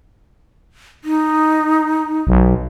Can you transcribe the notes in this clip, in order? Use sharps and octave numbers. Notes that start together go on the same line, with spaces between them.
D#4
B1